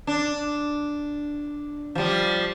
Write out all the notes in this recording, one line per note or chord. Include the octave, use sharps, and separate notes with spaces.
D4
F3 G3